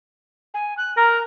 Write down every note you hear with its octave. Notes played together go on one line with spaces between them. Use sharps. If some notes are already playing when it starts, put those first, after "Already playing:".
G#5
F#6
A#4 A#5